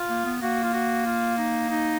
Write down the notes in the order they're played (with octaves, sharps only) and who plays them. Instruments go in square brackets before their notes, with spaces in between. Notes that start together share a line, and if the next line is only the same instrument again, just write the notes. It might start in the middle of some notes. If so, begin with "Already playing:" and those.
Already playing: [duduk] F4
[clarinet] A#3
B3
[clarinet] A#3 [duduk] F#4
[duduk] F4
F#4
F4
D#4
D#4